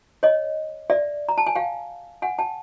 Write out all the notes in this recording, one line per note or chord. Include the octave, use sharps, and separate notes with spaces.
C#5 D#5
D5 E5
A#5
A5
G#5
F5 G5
F#5 G#5
G5 A5